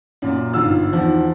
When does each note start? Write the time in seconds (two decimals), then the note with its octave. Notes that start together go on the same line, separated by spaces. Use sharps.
0.22 F#2 A#2
0.54 G1 G#2 F4 E6
0.93 E2 D#3 F3